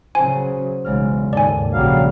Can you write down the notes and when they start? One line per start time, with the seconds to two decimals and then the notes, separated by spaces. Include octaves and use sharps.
0.15 C#3 F#3 C5 G#5
0.85 B1 E2 G#2 C#3 F6
1.33 D#2 G#2 A4 D5 D#5 G#5
1.73 A#1 C#3 F#3 G3 F5